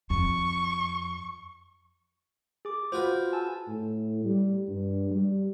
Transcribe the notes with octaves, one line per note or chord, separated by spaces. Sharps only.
F2 C#6
G#4 D6
F4 F#4 B4 C5
G#5 A5 E6
A2
G3
G2
G3